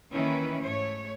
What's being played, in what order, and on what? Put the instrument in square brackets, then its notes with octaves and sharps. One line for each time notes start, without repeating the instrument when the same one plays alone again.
[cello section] D#3 E3 A#3 C#4 E4 B4
G#2 A3 C#5